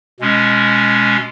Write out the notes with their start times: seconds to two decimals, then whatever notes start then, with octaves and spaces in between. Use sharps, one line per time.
0.20 B2 G#3 C#4